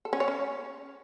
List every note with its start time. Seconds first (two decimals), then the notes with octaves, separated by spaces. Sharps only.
0.05 A4
0.13 C#4
0.20 C#5
0.28 C#4